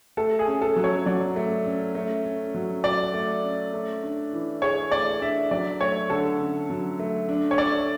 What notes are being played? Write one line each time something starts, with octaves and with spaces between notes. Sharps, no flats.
A3 A4
G#4
C#4
A4
F#3
C#5
F#3 D5
A3
C#4
A3
C#4
F#3
F#4 D5
A3
C#4
A3
D4
E3
G#4 C#5
A3 D5
D4 E5
F#3 D5
A3 C#5
D3 A4
C#4
F#3
A3
D4
C#5
A4 D5